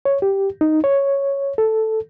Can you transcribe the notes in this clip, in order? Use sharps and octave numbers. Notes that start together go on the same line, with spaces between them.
C#5
G4
D#4
C#5
A4